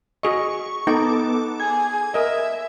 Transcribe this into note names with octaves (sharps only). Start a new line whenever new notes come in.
F#4 G#4 D#5 C#6
B3 D#4 A4 D6
G#4 G#6
A#4 D#5 E5